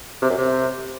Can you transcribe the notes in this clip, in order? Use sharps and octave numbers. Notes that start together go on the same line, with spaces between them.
C3
F#2
C3